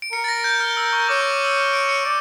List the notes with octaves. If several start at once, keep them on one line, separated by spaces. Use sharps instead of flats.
D7
A#4 C#7
A6
A#6
G6
F6
E6
C#6
C#5 D6
C#6
D6
E6
F6
D7
C#7
D5 D7